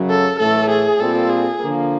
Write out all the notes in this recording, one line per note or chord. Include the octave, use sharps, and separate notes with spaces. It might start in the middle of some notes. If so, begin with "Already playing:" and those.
Already playing: F#2 C#3 F#3
A4
A2 E3 A3 A4
G#4
A#2 G3 C4 F4 A4
G#4
D3 F3 A#3